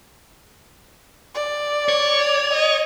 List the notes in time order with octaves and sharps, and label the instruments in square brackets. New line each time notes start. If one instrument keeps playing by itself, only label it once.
[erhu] D5
[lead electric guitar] C#5
[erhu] D#5